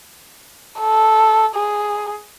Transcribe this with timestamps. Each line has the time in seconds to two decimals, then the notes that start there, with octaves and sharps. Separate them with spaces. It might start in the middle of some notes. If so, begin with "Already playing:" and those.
0.80 A4
1.55 G#4